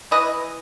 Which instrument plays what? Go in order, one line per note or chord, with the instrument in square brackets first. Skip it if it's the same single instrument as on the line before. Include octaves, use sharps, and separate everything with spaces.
[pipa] E3 B4 D#5